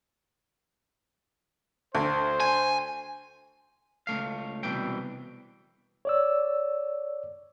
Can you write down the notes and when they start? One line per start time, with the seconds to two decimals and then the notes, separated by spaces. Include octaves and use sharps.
1.95 D2 C5
2.40 G#5
4.07 C#2 A3 F5
4.63 C2 B2 E3 G5
6.05 C#5 D5 E6